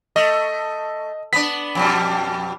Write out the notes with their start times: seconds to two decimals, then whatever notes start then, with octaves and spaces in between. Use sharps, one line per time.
0.16 A3 D#5
1.33 B3 D4 B6
1.75 F2 B2 G3